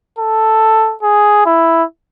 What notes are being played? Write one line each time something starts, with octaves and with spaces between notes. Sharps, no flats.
A4
G#4
E4